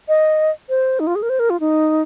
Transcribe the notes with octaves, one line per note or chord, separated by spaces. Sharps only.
D#5
C5
D#4
F4
G#4
A#4
C5
A#4
F4
D#4